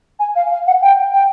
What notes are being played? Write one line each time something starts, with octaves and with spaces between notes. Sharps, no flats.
G#5
F5
F5
F#5
G5
G5